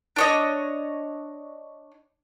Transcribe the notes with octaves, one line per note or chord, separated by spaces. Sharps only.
D4 C#5 D#5